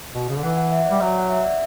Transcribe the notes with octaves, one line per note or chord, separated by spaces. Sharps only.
B2
C#3
D3
E3 F#5
F#5
E5
D5
G3
F#3 C#5
F#5
E5
D5